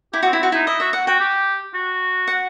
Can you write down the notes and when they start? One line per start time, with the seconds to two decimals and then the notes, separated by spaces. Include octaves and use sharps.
0.13 E4 G4
0.23 C4 F#4
0.33 E4
0.40 C4 F#4
0.52 D#4 E4
0.67 E4 D#5
0.80 F#4 E5
0.93 F#5
1.07 F#4 G5
1.20 G4
1.74 F#4
2.28 F#5